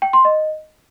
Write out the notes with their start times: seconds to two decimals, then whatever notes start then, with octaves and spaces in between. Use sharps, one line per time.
0.02 G5
0.13 C6
0.25 D#5